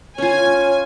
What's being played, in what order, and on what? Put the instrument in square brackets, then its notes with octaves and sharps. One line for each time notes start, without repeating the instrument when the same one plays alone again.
[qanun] C#4 F4 [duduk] C#5 [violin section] G#5